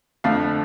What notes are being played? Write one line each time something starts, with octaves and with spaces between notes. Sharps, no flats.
F2 D3 F3 A3 F5